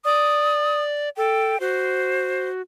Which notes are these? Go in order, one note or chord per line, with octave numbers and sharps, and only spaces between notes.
D5 D#6
A4 G5
F#4 C5